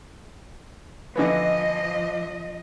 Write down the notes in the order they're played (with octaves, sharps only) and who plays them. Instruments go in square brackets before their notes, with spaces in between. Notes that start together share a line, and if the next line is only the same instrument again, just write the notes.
[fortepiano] D3 E3 B3 [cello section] F3 D#5